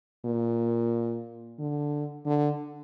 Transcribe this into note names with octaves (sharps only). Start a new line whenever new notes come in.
A#2
D3
D3